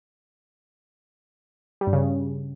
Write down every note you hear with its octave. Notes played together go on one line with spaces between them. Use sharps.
G3
G2
C#3